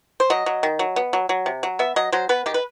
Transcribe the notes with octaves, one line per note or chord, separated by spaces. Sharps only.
C5
F#3 D#5
F#3
D#3
F#3
B3
F#3
F#3
C3
F#3
B3 E5
F#3 D#5
F#3 C5
B3 B4
D#3 G4
B4